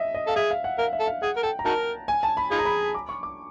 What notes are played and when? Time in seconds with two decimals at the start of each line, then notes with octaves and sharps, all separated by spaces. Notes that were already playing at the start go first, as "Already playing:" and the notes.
Already playing: D#5 E5
0.14 D#5
0.27 A4 F5
0.36 G#4 E5
0.51 F5
0.64 F#5
0.78 A#4 F5
0.93 E5
1.00 A4
1.07 F5
1.22 G#4 F#5
1.37 A#4
1.43 A4 G5
1.59 A#5
1.65 D#4 F#4 A#4 A5
2.08 G#5
2.23 A5
2.37 B5
2.51 D#4 F4 G#4 B5
2.59 A#5
2.65 B5
2.95 D6
3.09 C#6
3.23 D6